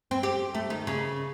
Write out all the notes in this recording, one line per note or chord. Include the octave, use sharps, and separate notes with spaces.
C4
G4
A3
D#3
C#3